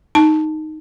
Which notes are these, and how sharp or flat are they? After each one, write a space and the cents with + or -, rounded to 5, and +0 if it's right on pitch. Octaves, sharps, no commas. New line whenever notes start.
D#4 +0 A5 +0